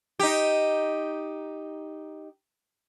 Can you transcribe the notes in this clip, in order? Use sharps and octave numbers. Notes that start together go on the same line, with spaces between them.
D#4 G4